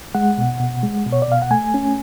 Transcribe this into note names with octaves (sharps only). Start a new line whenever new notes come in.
G#3 F#5
B2
B2
G#3
B2
C#5
D5
B2 F5
F#5
A3 G#5
C#4